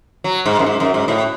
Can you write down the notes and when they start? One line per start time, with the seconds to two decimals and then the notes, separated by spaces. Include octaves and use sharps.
0.24 F#3
0.46 G#2
0.59 F#2
0.66 G#2
0.80 F#2
0.94 G#2
1.08 A2